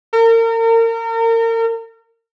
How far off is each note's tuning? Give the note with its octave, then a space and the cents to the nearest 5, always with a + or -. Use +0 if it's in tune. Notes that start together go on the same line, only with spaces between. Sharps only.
A#4 -35